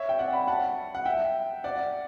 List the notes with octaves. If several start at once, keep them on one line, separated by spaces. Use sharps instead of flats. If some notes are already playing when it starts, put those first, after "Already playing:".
Already playing: C#5 E5
G5
D5 F#5
G5 B5
F#5 A5
F#5
E5 G5
D5 F#5